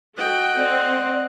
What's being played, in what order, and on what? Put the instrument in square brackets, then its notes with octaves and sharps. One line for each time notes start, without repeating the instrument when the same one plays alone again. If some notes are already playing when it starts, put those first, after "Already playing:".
[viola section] F#4 A4 G5 [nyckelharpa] D#5 F#5
[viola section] C4 [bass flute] D5